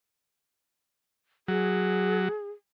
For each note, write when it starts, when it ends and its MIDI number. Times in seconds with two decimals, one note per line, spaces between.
1.48 2.28 54
1.48 2.50 68